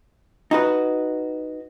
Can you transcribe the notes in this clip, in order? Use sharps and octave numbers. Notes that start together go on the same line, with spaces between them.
D#4 F#4 B4